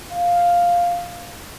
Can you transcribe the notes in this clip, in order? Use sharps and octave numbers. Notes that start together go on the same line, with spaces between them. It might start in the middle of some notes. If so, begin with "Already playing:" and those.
F5